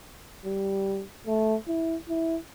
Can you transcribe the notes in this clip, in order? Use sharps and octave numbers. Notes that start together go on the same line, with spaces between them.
G3
A3
E4
E4